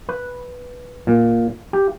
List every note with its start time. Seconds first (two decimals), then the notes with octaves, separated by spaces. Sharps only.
0.09 B4
1.07 A#2
1.73 G4